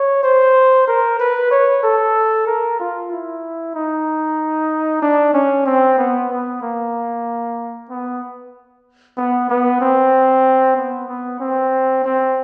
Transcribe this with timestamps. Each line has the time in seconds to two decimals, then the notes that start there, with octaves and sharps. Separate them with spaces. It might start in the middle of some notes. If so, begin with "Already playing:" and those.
Already playing: C#5
0.23 C5
0.87 A#4
1.19 B4
1.51 C#5
1.83 A4
2.47 A#4
2.79 F4
3.11 E4
3.75 D#4
5.02 D4
5.34 C#4
5.66 C4
5.98 B3
6.30 B3
6.62 A#3
7.90 B3
9.17 B3
9.49 B3
9.81 C4
10.77 B3
11.08 B3
11.40 C4
12.04 C4